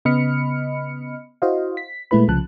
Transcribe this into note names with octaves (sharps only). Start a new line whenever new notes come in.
C#3 B3 D#5 B5 F6 C#7
E4 F#4 C5 D#5 F5
B6
A#2 G#3 A3 E4 B4 B5
C2 C#3 F3 A5 F#6